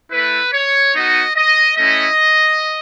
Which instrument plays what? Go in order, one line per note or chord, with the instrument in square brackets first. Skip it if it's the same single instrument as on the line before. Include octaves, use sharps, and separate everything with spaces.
[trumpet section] A3 E4 B4
C#5
B3 D#4 F#4 D#5
D#5
A3 C#4 E4 D#5